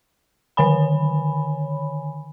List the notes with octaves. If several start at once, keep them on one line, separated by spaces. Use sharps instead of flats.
D3 D#3 C#5 G#5 B5